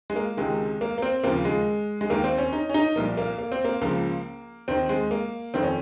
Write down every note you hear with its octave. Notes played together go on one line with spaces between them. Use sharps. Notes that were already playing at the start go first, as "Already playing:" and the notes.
G#3
A#3
C#2 C3 D#3 G#3
A#3
A#3
C4
D#2 C#3 F3 A#3
G#3
G#3
D#2 D#3 A#3
C4
C#4
D#4
C#4
D#4
C2 A#2 F3 A#3
A#3
A#3
C4
A#3
C#2 C#3 F3 A#3
D#2 D#3 C4
G#3
A#3
F2 D#3 C4
C#4